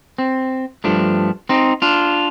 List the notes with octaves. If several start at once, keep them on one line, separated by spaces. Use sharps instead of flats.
C4
G2 F3 A3 D4
C4 D#4
D4 F4